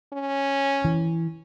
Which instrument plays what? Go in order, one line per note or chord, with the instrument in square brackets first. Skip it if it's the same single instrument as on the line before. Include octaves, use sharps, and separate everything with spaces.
[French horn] C#4
[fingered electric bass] E3